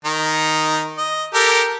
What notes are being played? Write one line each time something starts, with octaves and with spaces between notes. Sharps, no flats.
D#3 D#4
D#5
G4 A4 A#4